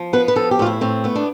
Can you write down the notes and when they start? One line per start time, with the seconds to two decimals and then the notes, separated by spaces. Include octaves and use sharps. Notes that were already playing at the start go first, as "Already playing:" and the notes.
Already playing: F3
0.13 B3 B4
0.28 B4
0.36 F3 A4
0.51 G4
0.59 A2 F4
0.66 E4
0.81 A2 C4
1.04 A3 B3
1.16 D4